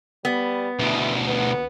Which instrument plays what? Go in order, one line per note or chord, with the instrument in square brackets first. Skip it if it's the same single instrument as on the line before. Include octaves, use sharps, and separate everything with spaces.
[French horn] G3 [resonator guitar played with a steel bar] B3
[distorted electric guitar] D2 B2 [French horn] E3
[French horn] B3